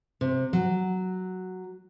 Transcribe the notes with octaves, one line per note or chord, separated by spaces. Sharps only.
C3
F#3